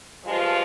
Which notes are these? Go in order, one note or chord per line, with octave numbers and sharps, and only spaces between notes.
G2 F3 G#3 F4